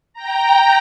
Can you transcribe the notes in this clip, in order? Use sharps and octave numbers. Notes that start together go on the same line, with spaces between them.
G5 A#5